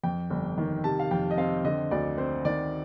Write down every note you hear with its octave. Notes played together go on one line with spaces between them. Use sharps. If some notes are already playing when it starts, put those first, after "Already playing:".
F2 G5
G1
D#3
C3 A5
F5
F2 G5
D#5
C4 F5
D3 D#5
D2 D5
C4 C5
D#3 D5